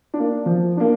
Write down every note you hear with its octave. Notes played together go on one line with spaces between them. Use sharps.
D4
A#3
F3
A#3 D4